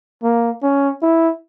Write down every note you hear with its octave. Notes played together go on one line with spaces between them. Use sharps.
A#3
C#4
E4